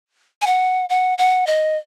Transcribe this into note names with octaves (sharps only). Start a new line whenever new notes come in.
G#5
F#5
F#5
F#5
D#5